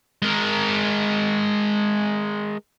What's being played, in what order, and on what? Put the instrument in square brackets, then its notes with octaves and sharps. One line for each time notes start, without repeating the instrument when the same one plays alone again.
[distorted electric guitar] G#3 A#4